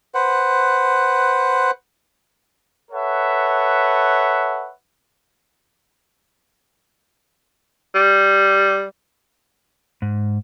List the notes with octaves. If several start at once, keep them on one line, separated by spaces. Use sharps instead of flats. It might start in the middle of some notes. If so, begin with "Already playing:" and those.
B4 C5 F#5
A4 B4 C#5 E5 F#5
G3
G#2